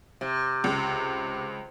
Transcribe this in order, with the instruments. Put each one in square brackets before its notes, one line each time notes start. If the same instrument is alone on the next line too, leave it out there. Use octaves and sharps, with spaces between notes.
[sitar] C3
[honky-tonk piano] C#2